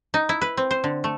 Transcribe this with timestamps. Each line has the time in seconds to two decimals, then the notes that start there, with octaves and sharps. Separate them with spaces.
0.14 D#4
0.29 E4
0.41 B4
0.57 C4
0.71 C5
0.84 D3
1.04 A3